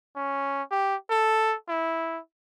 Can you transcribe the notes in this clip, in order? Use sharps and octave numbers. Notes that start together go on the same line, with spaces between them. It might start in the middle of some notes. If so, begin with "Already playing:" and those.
C#4
G4
A4
E4